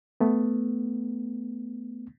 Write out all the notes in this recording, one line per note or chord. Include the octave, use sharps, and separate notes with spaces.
A3 B3